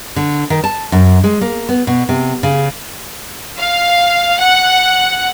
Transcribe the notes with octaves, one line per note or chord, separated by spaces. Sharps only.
D3
D#3
A5
F#2
G#3
A#3
B3
B2
C3
C#3
F5
F#5